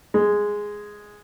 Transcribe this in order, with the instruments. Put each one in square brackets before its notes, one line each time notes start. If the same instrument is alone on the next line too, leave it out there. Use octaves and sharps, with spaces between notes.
[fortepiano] G#3